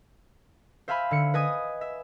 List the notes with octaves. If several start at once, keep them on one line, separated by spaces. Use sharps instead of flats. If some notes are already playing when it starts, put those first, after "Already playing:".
C5 E5 F5 G#5 B5
D3 C#7
B4 D#5 G#5 D#6
E5